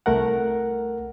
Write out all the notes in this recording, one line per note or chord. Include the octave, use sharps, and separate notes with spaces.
C2 A3 A#4 F#5